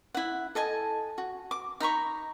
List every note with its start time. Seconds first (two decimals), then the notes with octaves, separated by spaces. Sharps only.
0.14 E4 F#5
0.55 A4 D#5 G#5 A5
1.18 F#4
1.51 D6
1.80 D#4 A#5 B5 C#6